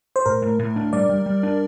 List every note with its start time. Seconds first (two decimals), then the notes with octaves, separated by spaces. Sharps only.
0.16 C5
0.26 A2 A#4
0.42 A2
0.59 A2
0.76 D4
0.93 G3 D5
1.09 G3
1.26 G3
1.43 D4